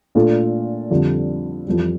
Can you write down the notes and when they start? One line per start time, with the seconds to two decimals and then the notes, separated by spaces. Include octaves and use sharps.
0.15 A#2 A3 D4 F4 A4
0.90 F2 D3 G3 C4
1.67 F2 E3 G3